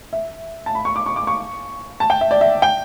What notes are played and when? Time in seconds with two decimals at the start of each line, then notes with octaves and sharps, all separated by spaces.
0.13 E5
0.66 A5
0.75 B5
0.85 C#6
0.96 D6
1.06 C#6
1.16 D6
1.27 C#6
2.00 A5
2.10 G5
2.21 E5
2.31 D5
2.41 E5
2.62 G5